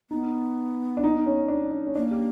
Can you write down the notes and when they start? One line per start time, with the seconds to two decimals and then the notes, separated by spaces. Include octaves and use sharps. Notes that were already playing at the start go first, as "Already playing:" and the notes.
0.11 B3 D#4
0.97 D4
1.04 D#4
1.26 C#4
1.48 D4
1.71 D4
1.87 C#4
1.95 A#3 D4
2.11 G4